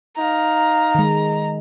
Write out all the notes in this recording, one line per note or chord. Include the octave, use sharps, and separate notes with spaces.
D#4 F5 A#5
D#3 G#3